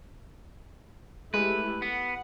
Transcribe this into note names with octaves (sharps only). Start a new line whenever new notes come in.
G#3 A3 E4 G4 B4
B3 F#5